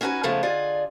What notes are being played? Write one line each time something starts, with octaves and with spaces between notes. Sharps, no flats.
C#4 D#4 F#4 B4 G#5
C#3 F3 G#3 A3 B3
D3 F4 G#4 D5 D#5